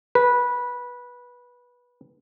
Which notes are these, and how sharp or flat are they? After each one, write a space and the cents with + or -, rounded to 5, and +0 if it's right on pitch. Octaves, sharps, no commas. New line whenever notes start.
B4 -15